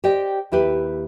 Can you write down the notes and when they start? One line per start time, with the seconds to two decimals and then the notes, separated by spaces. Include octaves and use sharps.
0.04 G4 C5 D5 D#5 G5
0.52 D#2 E4 G4 B4